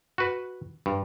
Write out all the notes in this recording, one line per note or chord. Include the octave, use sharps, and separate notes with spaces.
F#4 B4
G2